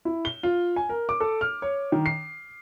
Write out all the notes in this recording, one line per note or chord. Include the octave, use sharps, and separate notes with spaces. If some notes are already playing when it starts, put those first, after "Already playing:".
E4
G7
F4
G#5
A#4
D6
A4
F6
C#5
D#3
C7